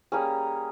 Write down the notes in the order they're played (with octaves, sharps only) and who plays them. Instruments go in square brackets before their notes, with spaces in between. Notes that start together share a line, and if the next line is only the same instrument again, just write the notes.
[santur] G3 A#3 C#4 G#4